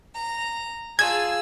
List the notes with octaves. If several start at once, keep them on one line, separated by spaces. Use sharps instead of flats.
A#5
F4 G#4 G#5 A5 E6 G#6